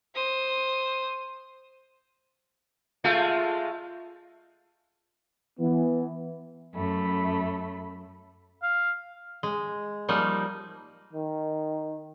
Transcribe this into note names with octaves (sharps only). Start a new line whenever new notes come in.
C5 D#6
G#3 A3 F4
E3 B3
F#2 A3 B5
F5
G#3
F3 G3 A#3 D#4
D#3